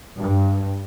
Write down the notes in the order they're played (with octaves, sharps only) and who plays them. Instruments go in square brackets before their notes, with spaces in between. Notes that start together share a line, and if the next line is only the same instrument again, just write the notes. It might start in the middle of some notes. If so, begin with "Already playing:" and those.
[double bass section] G2